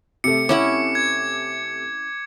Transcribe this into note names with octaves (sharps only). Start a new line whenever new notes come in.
C3 A3 C#7
C#4 E4 F#5 D6
G#6